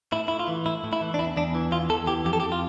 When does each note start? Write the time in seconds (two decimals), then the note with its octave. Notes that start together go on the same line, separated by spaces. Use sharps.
0.12 A2 E4
0.28 A2 E4
0.39 F4
0.48 E3
0.66 A2 E4
0.84 A2
0.93 E4
1.01 E3
1.14 D4
1.19 E2 E4
1.37 E2 D4
1.55 E3
1.72 E2 F4
1.89 E2 A4
2.07 E3 G4
2.25 F2 G4
2.33 A4
2.40 G4
2.43 F2
2.52 F4